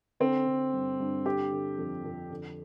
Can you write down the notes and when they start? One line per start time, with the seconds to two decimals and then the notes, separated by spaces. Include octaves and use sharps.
0.20 D3 C4
0.47 D3
0.73 G2
1.00 G2
1.26 D3 G4
1.52 D3
1.78 F2
2.04 F2
2.31 D3